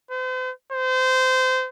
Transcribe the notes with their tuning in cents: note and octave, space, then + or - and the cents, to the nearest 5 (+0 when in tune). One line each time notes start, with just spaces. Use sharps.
C5 -40
C5 -25